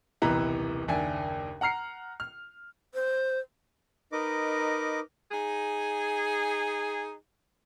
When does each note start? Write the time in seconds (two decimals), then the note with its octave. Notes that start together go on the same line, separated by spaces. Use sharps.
0.22 D#1 B1 C3 E3 B4 A#5
0.88 F#1 D#2 D4 E5 G#5
1.61 F#5 A#5 F6 C7 C#7
2.20 F6
2.94 C5
4.12 D#4 A#4 B4 D#5 D6
5.32 D#4 G#4